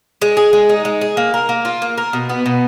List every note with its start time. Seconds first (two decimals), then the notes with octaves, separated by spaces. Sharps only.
0.22 G#3
0.37 G#4
0.53 G#3
0.69 D#4
0.85 G#3
1.01 G#4
1.17 A#3
1.34 A#4
1.49 A#3
1.65 F4
1.82 A#3
1.98 A#4
2.13 B2
2.29 B3
2.46 B2